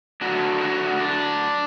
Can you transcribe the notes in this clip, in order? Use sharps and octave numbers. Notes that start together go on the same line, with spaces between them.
D3 F#3 A3 D4 F#4
F#4
D4